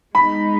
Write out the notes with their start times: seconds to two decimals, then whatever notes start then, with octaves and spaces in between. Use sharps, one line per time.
0.15 G#3 B3 D#4 B5